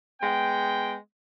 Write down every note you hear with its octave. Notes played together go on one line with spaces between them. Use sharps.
G#3 B3 G5